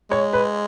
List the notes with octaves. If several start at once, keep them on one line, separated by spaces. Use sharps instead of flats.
G#3 C#5
B4